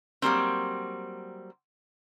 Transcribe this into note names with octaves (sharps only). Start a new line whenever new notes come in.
F#3 G3 A#3 C4